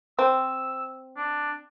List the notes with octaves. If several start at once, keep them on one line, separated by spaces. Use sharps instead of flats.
C4 E6
D4